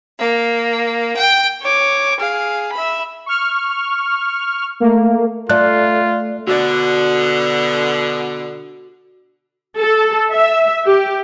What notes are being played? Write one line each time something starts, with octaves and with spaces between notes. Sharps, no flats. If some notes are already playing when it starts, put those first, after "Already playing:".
A#3
G5
C#5 D6
G#4 F5
E5 B5
C#6 F6
A3 A#3
A3 F4 D5 F#6
B2 D3 F#4 D5
A4
E5
G4